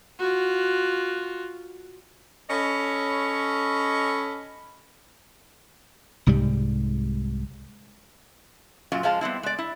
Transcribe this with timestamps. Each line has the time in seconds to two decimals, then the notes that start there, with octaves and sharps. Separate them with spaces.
0.19 F4 F#4
2.50 C#4 A4 C#5 D#5 B5
6.27 C2 G#2 C3 G3
8.92 F#2 A#2 F#3 F4
9.03 F3 G#3 F5 A5
9.21 G3 B3 C4 E4
9.43 G#3 D5
9.59 E4